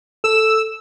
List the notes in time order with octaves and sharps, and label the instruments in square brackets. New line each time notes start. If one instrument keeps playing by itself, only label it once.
[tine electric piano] A4 [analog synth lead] E6